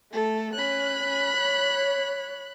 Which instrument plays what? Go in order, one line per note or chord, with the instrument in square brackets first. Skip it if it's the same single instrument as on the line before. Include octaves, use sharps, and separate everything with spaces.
[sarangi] A3 [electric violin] A4
[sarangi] C#4 [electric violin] B5 F#6
[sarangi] C#4
C#5